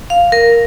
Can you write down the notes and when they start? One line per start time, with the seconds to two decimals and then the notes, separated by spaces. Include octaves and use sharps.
0.10 F5
0.32 A#4